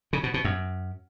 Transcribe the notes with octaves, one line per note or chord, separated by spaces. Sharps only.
C#3
B2
B2
F#2